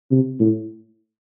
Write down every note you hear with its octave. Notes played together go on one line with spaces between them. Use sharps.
C3
A2